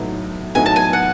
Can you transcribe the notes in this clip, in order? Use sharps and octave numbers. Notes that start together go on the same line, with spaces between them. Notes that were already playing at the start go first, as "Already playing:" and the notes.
Already playing: A2 F#3 B3 D#4
A2 F#3 B3 D#4 G#5
A5
G#5
F#5